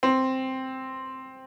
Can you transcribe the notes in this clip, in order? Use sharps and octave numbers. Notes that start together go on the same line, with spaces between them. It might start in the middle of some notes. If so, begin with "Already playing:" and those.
C4